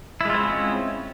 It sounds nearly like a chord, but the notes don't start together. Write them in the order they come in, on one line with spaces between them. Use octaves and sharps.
E4 G#3 F4 C4 C#4